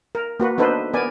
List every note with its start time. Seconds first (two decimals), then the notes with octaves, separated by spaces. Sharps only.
0.15 A#4
0.40 A#3 F#4 B4
0.58 B3 D4 D#4 A4 B4 C5
0.93 B3 A#4 D5 G#5